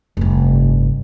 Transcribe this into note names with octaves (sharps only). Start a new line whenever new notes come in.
F1 G2